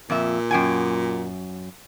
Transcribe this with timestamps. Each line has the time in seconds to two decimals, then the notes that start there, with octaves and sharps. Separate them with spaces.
0.10 F2 A#2 E5
0.51 F#2 G5 G#5